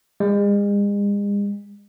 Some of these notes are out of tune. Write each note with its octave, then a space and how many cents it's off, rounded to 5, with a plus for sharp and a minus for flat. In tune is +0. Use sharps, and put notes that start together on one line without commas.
G#3 -40